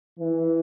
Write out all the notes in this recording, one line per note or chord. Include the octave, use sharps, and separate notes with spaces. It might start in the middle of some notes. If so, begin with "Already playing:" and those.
E3